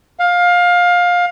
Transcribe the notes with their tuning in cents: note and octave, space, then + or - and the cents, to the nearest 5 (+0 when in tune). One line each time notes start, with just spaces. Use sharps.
F5 +20